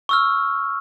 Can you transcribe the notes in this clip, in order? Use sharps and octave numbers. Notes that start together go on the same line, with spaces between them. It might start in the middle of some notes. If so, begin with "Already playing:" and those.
C#6 E6 F6